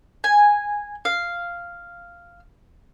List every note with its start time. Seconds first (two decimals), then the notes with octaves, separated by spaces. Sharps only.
0.24 G#5
1.05 F5